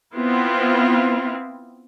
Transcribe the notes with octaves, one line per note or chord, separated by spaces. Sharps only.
B3 C4 E4 F4